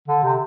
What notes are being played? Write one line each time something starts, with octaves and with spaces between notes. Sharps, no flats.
D3
C3